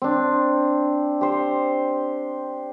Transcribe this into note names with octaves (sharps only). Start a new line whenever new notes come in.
C4 D4
G4 C5